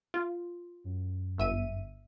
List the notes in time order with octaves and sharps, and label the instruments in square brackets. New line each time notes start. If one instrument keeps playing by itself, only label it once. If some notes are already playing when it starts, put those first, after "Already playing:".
[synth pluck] F4
[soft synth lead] F#2
[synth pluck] G1 E5 D#7